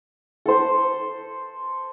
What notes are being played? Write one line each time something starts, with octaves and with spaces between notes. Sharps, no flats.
A4 C5